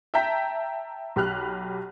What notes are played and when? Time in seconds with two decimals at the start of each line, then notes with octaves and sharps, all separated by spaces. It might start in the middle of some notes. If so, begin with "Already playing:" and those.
0.14 E5 G5 A5 A#5 G6 B6
1.16 B1 G4 B5 F6 F#6